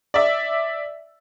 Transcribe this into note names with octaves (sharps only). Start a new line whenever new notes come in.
D5 E5